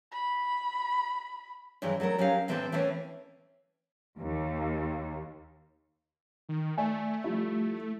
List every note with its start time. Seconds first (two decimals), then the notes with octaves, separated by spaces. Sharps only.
0.12 B5
1.82 G2 D#3 E3 F#3 G#3
2.00 F#3 A3 C4 A#4
2.18 F#3 C#4 D#4 G4 A#4 F5
2.48 A2 E3 C4 D4 A4
2.72 E3 A3 A#3 C4 C#4
4.17 D#2
6.49 D#3
6.77 A3 D5 E5 G#5
7.24 F3 G3 E4